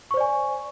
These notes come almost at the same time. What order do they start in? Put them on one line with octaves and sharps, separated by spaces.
C#6 C5 D5 G#5